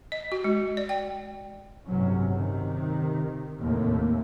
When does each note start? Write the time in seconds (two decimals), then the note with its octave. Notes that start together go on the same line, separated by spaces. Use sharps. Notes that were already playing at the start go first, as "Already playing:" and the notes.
0.12 D#5
0.32 F#4
0.44 G#3
0.77 D5
0.89 G5
1.86 A1 G2 C3 F#3 C#4
2.35 C3 D#3
3.59 D#2 A2 C3 A3 A#3